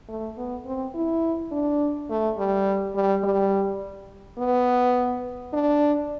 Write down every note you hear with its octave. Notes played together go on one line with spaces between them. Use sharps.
A3
B3
C4
E4
D4
A3
G3
G3
G3
B3
D4